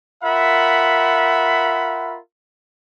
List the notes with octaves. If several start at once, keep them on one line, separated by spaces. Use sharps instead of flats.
F4 A#4 E5 F#5 B5